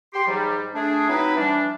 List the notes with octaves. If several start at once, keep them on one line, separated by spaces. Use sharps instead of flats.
G4 C6
G#2 E3 F#3 G3
A3 D4 G#4
F#3 C4 D#4 E4 B4
E3 F3 G3 D4